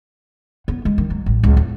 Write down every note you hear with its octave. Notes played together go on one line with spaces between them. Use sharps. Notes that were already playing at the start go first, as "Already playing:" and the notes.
B3
G#3
D#3
F#3
A1
C#2
E2